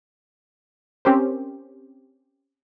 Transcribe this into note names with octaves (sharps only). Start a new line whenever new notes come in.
C4 C#4 G4 A#4 C5